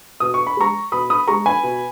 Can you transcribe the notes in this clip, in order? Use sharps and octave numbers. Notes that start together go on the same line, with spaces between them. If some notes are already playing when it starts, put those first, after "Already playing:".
B2 D#6
C#6
B5
G#3 A#5 C#6
B2 B5 D#6
B5 D#6
G#3 A#5 C#6
G#5 B5
B2